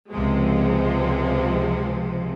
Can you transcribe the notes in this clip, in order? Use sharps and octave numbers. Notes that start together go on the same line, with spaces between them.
C#2 C3 F3 G#3